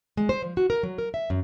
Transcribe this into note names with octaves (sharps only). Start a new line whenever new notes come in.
G#3
C5
F3
F#4
A#4
F#3
A#4
E5
F#2